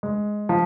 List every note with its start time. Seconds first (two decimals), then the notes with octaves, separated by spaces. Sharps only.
0.03 G#3
0.49 F3